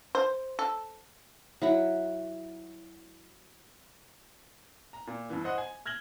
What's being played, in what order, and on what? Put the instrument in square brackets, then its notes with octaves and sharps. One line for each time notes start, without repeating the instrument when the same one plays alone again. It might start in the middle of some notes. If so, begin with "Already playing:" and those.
[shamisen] C5
A4
[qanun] F#3 E4 F#5
[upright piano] A#5
A#2
G2 E3
C5 D#5 F#5
G#5
F6 G#6 A#6 F#7 G7